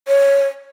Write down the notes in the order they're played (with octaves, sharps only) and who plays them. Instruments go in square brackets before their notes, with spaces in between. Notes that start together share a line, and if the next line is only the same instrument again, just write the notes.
[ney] C#5